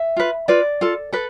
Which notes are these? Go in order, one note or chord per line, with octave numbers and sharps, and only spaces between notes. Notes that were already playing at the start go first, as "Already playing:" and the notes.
Already playing: E5
F4 B4
F4 B4 D5
F4 A4
A4 B4